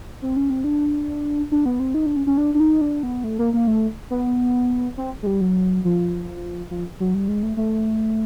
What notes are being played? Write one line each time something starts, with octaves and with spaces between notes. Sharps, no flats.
C4
C#4
C4
D4
D4
B3
C4
D#4
D4
C#4
C#4
D4
D4
D#4
D4
B3
A3
A#3
A#3
A3
B3
C4
G#3
G3
F#3
F3
F3
F#3
G3
G#3
A3
A3